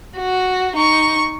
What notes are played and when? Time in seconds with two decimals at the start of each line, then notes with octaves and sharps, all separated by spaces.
0.17 F#4
0.76 D#4 C#6